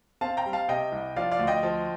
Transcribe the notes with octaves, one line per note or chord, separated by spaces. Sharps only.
C4 F5 A5
G5 A#5
G3
F5 A5
C3 D#5 G5
C2
F3 D5 F5
D5 F5
D2
D#5 G5
F3